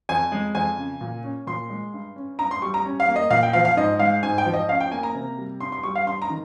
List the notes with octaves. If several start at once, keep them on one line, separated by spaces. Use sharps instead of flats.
F2 G#5
G#3
F2 G#5
C#3
A#2
C#4
A#2 C6
G#3
G2
C#4
G2 A#5
C6
G3 C#6
A#5
C#4
F5
A#3
D#5
A#2 F5
G5
F3 F5
F5
G#2 D#5
G#3 F5
G#2 G#5
G5
F3
D#5
C#4 F5
G5
A#3 G#5
A#5
C3
G3
G2 C6
C6
G3 C#6
F5
G2 C6
A#5
D#3